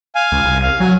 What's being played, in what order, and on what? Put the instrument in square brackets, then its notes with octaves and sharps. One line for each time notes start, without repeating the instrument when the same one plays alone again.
[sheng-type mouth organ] F5 G#5
[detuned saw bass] C#2
C2
[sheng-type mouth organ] F5
[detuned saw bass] F#3 [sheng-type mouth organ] G#5